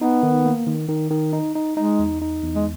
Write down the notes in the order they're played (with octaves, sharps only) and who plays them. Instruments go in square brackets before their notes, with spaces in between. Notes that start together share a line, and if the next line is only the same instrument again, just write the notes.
[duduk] B3 [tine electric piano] D#4
[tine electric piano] D#3
A#3
D#3
D#3
D#3
D#4
D#4
[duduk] G#3 [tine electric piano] D#4
[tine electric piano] E2
D#4
E2
[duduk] G#3